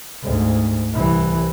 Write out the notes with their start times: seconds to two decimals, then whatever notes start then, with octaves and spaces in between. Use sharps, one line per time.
0.23 D2 G#2
0.93 C2 E3